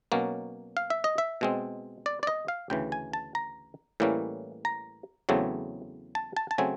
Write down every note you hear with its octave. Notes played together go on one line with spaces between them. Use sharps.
B2 F#3 A#3 C#4
F5
E5
D#5
E5
B2 G#3 C4
D5
D5
D#5
F5
D2 C#3 E3 G5
G#5
A5
A#5
A2 E3 G3 A#3 C#4
A#5
E2 C#3 F#3 A3 C4
A5
A5
A5
C#3 F#3 A3 C4 G#5